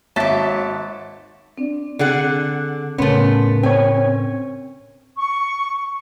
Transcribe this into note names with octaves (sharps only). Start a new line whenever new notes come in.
G#1 F#3 E5 A5 D6 A6 B6
C4 D4 D5
D3 G#4 F#5
A2 C#3 A3 B3 C#4 A#4 C6
C4 C#5 G#5
C#6